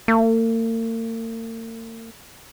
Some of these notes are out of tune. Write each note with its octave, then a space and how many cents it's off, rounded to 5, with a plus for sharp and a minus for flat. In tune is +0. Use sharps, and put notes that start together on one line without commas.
A#3 -45